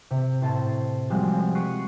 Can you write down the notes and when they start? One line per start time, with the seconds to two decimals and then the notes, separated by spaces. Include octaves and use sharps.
0.11 C3
0.41 A2 C5 A5 C7
1.10 F3 G3 G#3 C4 F#4
1.55 C#6 F#6 B6 C7 D7 D#7